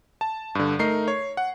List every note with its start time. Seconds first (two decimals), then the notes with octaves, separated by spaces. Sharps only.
0.21 A5
0.55 G2 D3
0.79 A3 D#4 A#4 C7
1.08 C#5
1.37 F#5